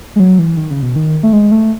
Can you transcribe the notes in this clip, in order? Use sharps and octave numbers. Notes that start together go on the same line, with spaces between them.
G#3
F#3
E3
D#3
C#3
B2
D#3
A3
G#3
A3